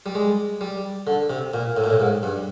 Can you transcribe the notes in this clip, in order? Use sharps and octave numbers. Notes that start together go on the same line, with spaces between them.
G3
G#3
G3
D3
C3
A#2
A2
A#2
A2
G#2
G2